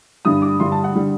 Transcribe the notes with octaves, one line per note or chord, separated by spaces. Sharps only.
G2 D3 G3 D#6
D6
G2 D3 G3 C6
A5
F#5
D3 G3